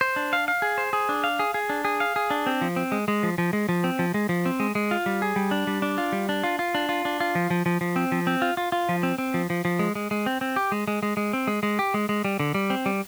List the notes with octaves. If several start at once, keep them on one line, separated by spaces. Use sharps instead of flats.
C5
D4
F5
F5
G#4
C5
G#4
D4
F5
G#4
G#4
D4
G#4
F5
G#4
D4
C4
F3
C4
G#3
G#3
F3
F3
G#3
F3
C4
F3
G#3
F3
C4
G#3
G#3
F4
G3
G#4
G3
D4
G3
D4
F4
G3
D4
F4
F4
D4
F4
D4
F4
F3
F3
F3
F3
C4
F3
C4
F4
F4
F4
F3
C4
C4
F3
F3
F3
G#3
G#3
G#3
C4
C4
G4
G#3
G#3
G#3
G#3
C4
G#3
G#3
G4
G#3
G#3
G3
D3
G3
C4
G3